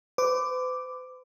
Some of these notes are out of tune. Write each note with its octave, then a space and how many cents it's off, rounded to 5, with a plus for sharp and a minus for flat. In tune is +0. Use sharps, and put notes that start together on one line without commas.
B4 +45 D6 +0